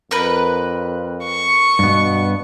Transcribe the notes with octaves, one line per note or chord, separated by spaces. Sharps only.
F2 A#4 B4
C#6
G2 B2 B3